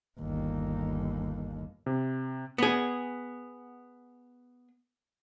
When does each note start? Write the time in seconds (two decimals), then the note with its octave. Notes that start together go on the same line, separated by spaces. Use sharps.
0.20 G1 D#2
1.86 C3
2.58 B3 G#4